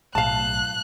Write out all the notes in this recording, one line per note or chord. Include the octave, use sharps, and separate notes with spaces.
B1 A2 F5 A5 F#6